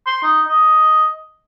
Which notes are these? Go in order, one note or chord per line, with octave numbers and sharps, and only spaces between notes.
C6
D#4
D#5